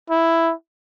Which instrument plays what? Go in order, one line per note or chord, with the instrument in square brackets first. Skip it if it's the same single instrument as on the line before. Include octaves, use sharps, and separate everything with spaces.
[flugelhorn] E4